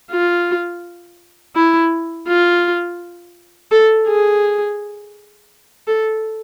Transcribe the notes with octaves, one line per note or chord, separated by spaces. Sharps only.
F4
E4
F4
A4
G#4
A4